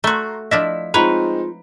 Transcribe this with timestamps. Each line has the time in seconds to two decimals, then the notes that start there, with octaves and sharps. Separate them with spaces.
0.04 A3 F#4 A#5 C6
0.51 F3 D4 E4 D#5 B6
0.94 G#3 C4 D#4 F4 B4 C#5 A#5 B5